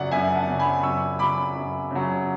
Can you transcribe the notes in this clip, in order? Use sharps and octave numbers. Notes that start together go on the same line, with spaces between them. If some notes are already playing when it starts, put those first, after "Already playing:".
Already playing: F#2 C#3 F#3 D5 F#5
F#2 E5 G#5
F#5 A5
C#3 F#3
G#5 B5
F#2 C#6 E6
C#3 F#3 B5 D6
F#2
C#3 F#3